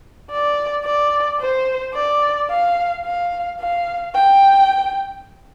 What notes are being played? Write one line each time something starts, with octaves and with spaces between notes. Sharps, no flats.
D5
D5
C5
D5
F5
F5
F5
G5